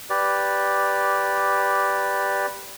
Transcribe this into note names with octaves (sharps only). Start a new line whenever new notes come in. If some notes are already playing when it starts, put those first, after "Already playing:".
G4 B4 D5